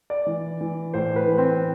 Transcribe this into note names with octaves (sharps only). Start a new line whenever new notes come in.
D5
E3
E3
A2 C5
B4
E3
C4